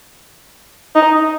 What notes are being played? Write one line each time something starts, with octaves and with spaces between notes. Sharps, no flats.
D#4